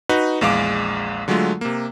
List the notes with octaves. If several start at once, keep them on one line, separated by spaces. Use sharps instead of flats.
D#4 F#4 B4
A#1 E2 G#3 F5 D6
D3 F#3 G#3 A3 F4
C3 A#3